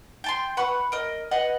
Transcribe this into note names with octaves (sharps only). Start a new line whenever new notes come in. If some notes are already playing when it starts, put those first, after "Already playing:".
G5 A5 C6
B4 F#5 B5 C#6
A#4 D#5
B4 D#5 F#5